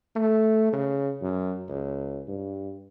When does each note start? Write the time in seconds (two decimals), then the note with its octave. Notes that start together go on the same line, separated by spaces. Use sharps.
0.16 A3
0.73 C#3
1.22 F#2
1.68 C#2
2.28 G2